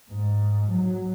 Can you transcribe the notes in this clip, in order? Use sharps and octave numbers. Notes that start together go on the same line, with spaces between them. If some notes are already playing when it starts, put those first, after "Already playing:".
G#2
F#3